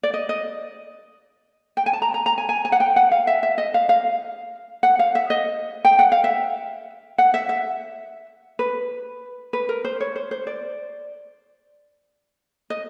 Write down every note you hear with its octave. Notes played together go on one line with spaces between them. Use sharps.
D5
D#5
D#5
G5
G#5
A5
A#5
A#5
A#5
G#5
G#5
G#5
F#5
G5
F#5
F5
E5
E5
D#5
F5
F5
F#5
F5
E5
D#5
G5
F#5
F5
E5
F#5
E5
E5
B4
B4
A#4
C5
C#5
C5
C5
D5
D#5